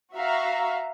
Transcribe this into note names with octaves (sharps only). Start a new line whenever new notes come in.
F#4 E5 F5 A#5